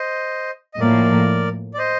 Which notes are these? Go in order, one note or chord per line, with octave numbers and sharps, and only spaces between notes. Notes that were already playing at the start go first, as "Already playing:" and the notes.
Already playing: C5 D#5
D#5
A2 F3 A#3 A#4 D5
D5
C5 D#5